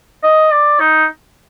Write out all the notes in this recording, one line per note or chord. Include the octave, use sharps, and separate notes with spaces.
D#5
D5
D#4